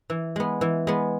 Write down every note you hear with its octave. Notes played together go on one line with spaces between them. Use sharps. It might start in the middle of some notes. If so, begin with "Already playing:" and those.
E3
G#3 B3
E3
G#3 B3